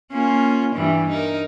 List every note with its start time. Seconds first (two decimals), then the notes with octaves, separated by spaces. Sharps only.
0.12 A#3 C#4 F4
0.75 G2 E3 G3
1.09 D#4 A#4